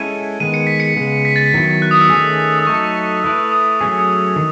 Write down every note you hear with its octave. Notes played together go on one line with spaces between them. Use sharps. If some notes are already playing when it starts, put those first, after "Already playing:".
Already playing: G#3 C#4 E4 A4 C#5 D#7
D#3 G#3 B3 D#7
C#7
B6
C#7
C#3 G#3 B3
B6
A6
B6
D#3 F#3 B3 E4
F#6
D#6
E6
D#3 A3 C#4 G#4
D#6
F#3 A3 D#4 A4 C#6
A3 E4 B4 D#6
D#6
F#3 A3 C#4 G#4
D#6
E6
D#3